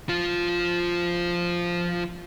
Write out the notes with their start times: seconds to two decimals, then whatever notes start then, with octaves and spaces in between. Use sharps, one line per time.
0.09 F3 F4